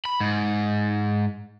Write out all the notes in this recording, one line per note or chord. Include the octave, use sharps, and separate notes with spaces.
B5
G#2